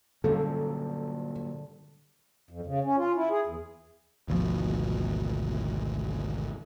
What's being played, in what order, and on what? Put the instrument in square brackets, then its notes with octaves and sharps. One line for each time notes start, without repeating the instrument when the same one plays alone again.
[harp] G2 D3 [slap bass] A#2 F#3 C#4 [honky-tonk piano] A4
[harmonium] F2
C#3
C#4
F4
E4
G#4
E2
[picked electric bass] G#1 D2 B2 F3